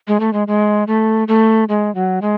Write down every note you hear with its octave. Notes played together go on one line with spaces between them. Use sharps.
G#3
A3
G#3
G#3
A3
A3
G#3
F#3
G#3